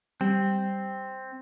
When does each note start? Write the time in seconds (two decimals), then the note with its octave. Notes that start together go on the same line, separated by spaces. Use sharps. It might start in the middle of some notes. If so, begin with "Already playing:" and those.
0.21 G3 C4